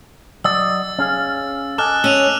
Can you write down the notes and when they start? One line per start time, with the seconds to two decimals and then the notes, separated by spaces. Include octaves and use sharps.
0.44 F#3 D5 D#5 E6 A6
0.99 C#4 G#4 F5
1.78 A4 D#5 G#5 D6 F6 F#6
2.04 C#4 E6 D#7 F7